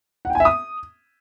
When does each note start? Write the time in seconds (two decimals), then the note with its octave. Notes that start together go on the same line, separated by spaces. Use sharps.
0.25 F#5
0.30 G5
0.35 G#5
0.40 E5
0.45 D#6